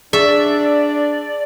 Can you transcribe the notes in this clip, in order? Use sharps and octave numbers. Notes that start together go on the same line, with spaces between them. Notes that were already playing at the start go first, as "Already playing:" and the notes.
D4 G#4 D5 E5